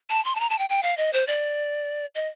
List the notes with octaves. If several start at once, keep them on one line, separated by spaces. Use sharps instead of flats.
A5
C6
A5
A#5
A5
G5
G5
F5
D#5
C5
D5
D#5